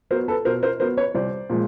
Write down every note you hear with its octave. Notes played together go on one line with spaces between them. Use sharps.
F#3 B3 A#4 C5
A4 B4
B2 A#4 C5
A#4 C5
F#3 B3 A#4 C5
B4 C#5
C2 C5 D5
A#2 F3 G#3